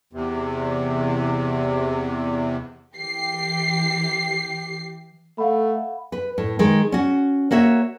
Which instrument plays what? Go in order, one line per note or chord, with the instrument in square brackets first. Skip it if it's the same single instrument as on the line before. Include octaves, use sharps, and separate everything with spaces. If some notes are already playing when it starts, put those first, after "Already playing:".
[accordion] E2 C3
[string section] E3 G4 C7
[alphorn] A3 [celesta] F5 F#5 B5
[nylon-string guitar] B4
A2
D#3 G#3
C#4 F#4
A#3 F#4 C#5 E5